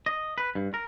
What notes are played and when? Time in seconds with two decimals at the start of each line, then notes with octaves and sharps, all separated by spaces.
0.06 D#5
0.38 B4
0.55 G2
0.74 A#4